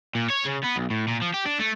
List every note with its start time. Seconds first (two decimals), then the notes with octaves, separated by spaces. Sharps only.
0.15 A#2
0.30 C#5
0.46 C#3
0.64 B3
0.76 B1
0.90 A2
1.08 A#2
1.22 F3
1.34 G4
1.46 D4
1.60 A3